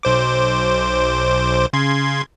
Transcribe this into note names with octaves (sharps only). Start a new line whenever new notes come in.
B1 C5 D6
C#3 C6 G#6